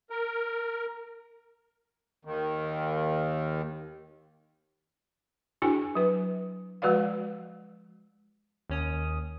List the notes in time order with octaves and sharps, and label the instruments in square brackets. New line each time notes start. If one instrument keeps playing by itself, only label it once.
[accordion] A#4
D#2 D#3
[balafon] D4 E4 F#4 G#4 G5 G#5
F#3 B4
F3 G#3 F#4 B4 D5 F5
[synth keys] D#2 C#4 D#6